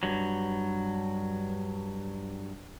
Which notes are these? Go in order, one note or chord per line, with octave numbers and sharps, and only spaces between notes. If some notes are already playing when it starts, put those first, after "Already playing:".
G2 F#3